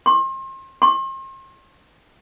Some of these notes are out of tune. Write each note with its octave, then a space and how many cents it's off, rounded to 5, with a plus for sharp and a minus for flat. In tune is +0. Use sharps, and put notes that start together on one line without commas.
C6 +35
C6 +40